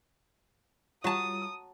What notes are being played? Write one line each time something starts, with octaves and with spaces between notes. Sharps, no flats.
G3 F4 F#4 C#5 F#5 A5 A#5 D#6